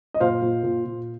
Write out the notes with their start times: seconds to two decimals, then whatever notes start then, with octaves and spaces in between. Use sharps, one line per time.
0.14 D#5
0.20 A#2 C5 F5
0.42 A#2
0.63 A#2
0.85 A#2